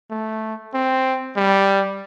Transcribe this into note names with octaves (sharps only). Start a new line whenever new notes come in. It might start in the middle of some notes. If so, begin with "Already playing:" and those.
A3
C4
G3